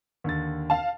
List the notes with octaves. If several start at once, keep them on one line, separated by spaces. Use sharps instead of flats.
D#2 D3 A6
F5 A5